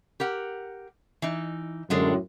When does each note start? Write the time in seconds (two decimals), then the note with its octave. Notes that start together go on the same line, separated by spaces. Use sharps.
0.20 G4 A#4 F#5
1.22 E3 D#4
1.90 F#2 A2 D3 G#3 D4